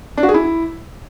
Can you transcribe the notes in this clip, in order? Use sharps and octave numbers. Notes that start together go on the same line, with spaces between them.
D4
F#4
G#4
E4